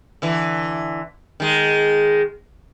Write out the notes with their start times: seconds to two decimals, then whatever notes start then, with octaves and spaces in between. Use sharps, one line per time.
0.22 D3 E3
1.40 D#3 G#3